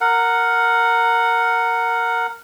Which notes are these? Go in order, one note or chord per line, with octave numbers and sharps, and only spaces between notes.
A#4 F#5